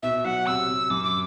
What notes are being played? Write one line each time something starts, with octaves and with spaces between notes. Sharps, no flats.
B2 E5
F#3 F#5
C3 E6
C3
F#2 D6
D6